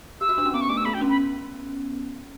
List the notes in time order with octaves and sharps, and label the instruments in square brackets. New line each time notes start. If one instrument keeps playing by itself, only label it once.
[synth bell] G4 [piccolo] E6
[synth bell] F#4
D4
C#4
[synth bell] B3 [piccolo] D6
[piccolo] C#6
[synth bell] A3 [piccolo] D6
[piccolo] E6
[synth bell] B3 [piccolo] B5
[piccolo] G5
[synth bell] C#4
[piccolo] B5